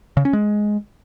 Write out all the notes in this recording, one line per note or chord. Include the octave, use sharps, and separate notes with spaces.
C#3
C#4
G#3